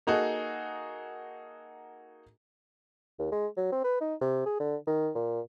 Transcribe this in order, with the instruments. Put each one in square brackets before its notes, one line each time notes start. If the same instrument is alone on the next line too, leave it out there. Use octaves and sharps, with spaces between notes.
[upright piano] A#3 D#4 F#4 G#4 A4 D#5
[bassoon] D#2
G#3
F#3
C4
B4
D#4
C3
G#4
D3
D#3
A#2